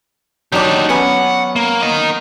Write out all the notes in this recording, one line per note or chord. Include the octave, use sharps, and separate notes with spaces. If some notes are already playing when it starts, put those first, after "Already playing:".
F#3 D4 D#4 G4
B3 C#4 F#5 G#5
A#3
A#4 D#5